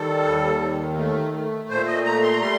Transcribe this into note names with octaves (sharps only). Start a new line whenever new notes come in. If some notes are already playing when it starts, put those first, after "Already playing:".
Already playing: D#3 G3 A4
D#2
D#3
A3
A3
A#2 C5
D#5
A3 A#5
C6
A#5
G3 C6